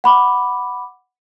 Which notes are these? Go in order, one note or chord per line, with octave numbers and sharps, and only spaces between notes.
F#5 B5 D6